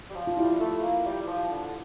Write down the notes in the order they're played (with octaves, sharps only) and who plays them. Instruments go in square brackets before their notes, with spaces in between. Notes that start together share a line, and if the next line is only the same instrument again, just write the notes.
[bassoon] G3
F3
[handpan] F4
[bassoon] G3 [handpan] E4
[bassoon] A3
A#3
G3
F3
D3